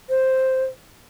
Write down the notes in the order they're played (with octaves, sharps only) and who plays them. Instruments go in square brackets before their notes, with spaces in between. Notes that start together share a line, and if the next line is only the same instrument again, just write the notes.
[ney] C5